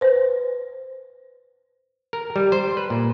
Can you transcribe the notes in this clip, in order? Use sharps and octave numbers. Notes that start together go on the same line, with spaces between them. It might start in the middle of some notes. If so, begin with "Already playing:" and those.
B4 C5
A#4
G3
C5
B4
A#2